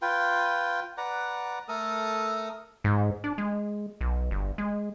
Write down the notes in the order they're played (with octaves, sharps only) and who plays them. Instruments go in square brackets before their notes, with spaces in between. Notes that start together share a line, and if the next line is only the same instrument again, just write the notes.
[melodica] F4 B4 G5
B4 D5 F#5 A#5
A3 A4 A#4 D#6
[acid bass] G#2
D4
G#3
B1
G1
G#3